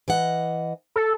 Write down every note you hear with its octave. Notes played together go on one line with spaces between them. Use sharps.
E3 D#5 F#5
A4